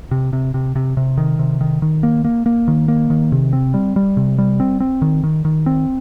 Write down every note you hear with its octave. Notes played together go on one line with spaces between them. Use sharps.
C3
C3
C3
C3
C3
D#3
C3
D#3
D#3
A#3
A#3
A#3
D#3
A#3
D#3
C3
C4
G3
G3
C3
G3
C4
C4
D#3
D#3
D#3
C4